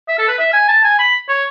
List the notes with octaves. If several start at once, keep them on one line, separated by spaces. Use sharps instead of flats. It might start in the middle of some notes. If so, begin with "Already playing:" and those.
E5
A4
B4
E5
G#5
A5
G#5
B5
C#5